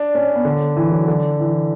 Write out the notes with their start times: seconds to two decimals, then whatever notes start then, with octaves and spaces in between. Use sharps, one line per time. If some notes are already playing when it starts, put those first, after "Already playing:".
Already playing: D4
0.15 C#4
0.35 B3
0.45 D3
0.76 E3
0.92 F#3
1.08 D3
1.39 E3